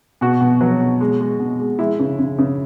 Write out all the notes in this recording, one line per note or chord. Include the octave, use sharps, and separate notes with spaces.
B2 F#4
B2
F#3
B2
G#3
G#3
B2
G#3
G#3 E4
C#3
C#3
C#3